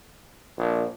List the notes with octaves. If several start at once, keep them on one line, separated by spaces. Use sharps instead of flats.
A#1